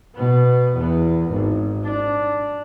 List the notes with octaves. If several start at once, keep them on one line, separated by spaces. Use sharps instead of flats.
B2 B3
E2 B3
G#1
D4